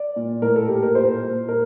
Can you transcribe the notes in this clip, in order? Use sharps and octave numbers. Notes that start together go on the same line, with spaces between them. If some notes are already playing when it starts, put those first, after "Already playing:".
Already playing: D5
A#2
A2 A#4
A4
A2 G4
A#4
A#2 C5
A#2
A#2 A#4